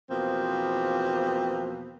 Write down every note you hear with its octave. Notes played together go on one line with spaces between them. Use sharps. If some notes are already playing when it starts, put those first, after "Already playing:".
E2 B2 F3 A#3 C4